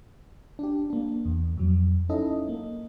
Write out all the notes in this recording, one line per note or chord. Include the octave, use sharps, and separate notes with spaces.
D4 G4
A#3 D4
E2
F2 F#3
C#4 D#4 E4 A4 D#5
A#3